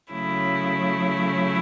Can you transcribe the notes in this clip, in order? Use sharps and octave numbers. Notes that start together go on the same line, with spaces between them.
C#3 F#3 A3 E4